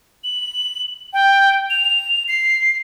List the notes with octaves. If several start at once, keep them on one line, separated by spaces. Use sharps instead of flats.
F#7
G5
F7
C7